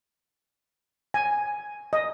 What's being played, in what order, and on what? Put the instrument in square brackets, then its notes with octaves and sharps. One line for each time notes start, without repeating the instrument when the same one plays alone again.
[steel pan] G#5
D#5